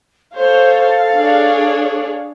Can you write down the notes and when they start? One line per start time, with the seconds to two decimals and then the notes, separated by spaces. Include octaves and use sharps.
0.36 A4 C5 C#5 F5
1.18 D4 G#4 C#5